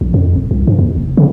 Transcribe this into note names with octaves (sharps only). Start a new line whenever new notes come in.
A#1
F2
D#1
C2
G2
D#2
F1
C#3